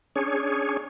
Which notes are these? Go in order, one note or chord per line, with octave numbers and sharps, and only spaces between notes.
C#4 D4 G#4 C#5